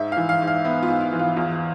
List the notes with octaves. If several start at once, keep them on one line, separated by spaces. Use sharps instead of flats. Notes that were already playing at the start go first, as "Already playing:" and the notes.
Already playing: G#2 E5
E3 F5
F5
G#2
F5
B3 E5
F4
G#2
E4
E3
F4
E2 F4